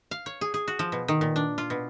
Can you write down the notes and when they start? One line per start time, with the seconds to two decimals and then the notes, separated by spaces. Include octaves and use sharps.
0.11 F5
0.26 C#5
0.41 G#4
0.54 G#4
0.68 F#4
0.79 F3
0.92 B2
1.08 D#3
1.21 A#2
1.36 D4
1.58 F4
1.70 B2